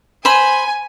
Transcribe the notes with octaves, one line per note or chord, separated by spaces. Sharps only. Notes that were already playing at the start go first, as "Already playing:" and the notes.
C5 G#5 B5